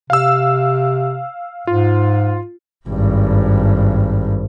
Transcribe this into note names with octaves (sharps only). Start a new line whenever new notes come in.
C3 F5 E6
G#2 F4
G#1 G2